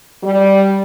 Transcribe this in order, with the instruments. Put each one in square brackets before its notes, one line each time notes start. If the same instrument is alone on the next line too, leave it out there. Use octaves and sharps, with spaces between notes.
[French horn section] G3